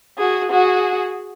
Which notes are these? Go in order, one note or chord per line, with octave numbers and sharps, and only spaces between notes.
F#4 G#4
F#4 G#4